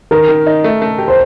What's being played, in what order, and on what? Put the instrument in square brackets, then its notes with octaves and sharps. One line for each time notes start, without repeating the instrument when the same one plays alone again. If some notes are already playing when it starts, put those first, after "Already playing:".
[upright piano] D#3 [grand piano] A#4
[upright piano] D#3
D#4
A3
A3
G4
[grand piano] C5